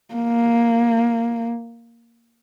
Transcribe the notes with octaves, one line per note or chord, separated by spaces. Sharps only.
A#3